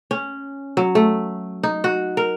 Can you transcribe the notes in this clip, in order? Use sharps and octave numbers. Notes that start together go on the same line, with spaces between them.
C#4
F#3
A3
D#4
F#4
A#4